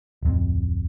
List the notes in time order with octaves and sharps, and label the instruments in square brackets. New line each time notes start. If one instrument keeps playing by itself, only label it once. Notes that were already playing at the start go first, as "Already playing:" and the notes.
[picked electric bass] D1 F2